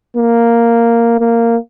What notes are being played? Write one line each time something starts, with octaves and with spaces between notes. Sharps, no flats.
A#3
A#3